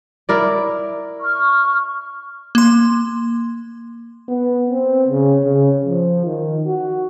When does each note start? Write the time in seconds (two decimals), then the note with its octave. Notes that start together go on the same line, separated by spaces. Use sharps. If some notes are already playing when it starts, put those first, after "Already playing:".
0.29 E4 A#4 D5
1.20 C#6 F6
2.55 A#3 C6
4.29 B3
4.69 C4
5.08 C#3
5.45 C#3
5.85 F3
6.25 D#3
6.66 F#4